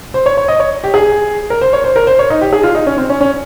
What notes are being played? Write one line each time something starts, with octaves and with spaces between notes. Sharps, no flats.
C5
C#5
C#5
D#5
C#5
G4
G#4
A#4
C5
C#5
C5
A#4
C5
C#5
D#4
G4
G#4
F4
D#4
C#4
C4
C#4
C#4